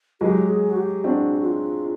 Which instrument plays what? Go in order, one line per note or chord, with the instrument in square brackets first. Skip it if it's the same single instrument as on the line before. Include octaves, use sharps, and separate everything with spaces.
[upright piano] F#3 G#3 [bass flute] G4
[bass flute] G#4
F#4
G4
[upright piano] C4 D4 [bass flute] F#4
[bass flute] F#4
F4